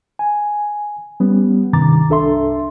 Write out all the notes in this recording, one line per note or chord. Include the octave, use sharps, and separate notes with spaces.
G#5
G3 B3 C#4
G2 C3 D#3 A#5 D6 A6
C2 D4 A4 E5 C6